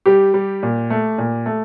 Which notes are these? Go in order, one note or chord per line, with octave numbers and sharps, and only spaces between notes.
G3 G4
G3
A#2
A3
A#2
A3